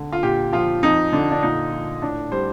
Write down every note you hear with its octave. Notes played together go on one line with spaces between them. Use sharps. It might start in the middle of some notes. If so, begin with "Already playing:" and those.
Already playing: D3
F4
A#2 G4
F3 F4
F2 D#4
D3 D4
D4
A#2 D#4
F3
A2 D4
G3 C5